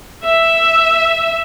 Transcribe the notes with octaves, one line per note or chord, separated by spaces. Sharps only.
E5